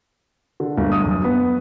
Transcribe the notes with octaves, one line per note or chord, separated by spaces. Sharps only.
D3
G1
D#6
F#2
B3